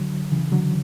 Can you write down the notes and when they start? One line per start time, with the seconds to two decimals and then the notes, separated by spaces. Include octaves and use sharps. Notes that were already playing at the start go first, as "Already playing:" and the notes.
Already playing: D3 F#3
0.32 C#3 E3
0.52 D3 F#3